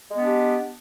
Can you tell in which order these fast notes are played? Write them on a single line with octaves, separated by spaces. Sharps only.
G#3 B3 D4 G4